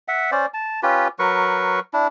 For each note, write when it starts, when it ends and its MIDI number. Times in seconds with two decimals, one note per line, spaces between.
0.08 0.31 76
0.08 0.31 78
0.32 0.46 61
0.32 0.46 72
0.32 0.46 74
0.54 0.80 81
0.83 1.08 61
0.83 1.08 65
0.83 1.08 67
0.83 1.08 71
1.19 1.80 54
1.19 1.80 70
1.19 1.80 71
1.19 1.80 85
1.93 2.07 62
1.93 2.07 64